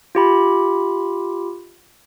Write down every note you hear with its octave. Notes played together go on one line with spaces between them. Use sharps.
F4 G4 B5